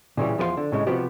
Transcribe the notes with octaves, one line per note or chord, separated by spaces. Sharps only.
A#2 C#3 E3 G3
E2 F3 B4 F5 C6
D3
A2 C#3 G#3
C3 F3 B3 F#4 G4